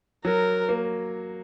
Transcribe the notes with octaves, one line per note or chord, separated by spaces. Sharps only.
F#3 A#4
A#3